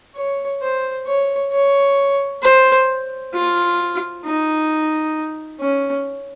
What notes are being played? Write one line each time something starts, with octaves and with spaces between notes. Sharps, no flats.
C#5
C5
C#5
C#5
C5
F4
D#4
C#4